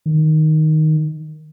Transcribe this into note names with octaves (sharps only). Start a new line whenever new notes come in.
D#3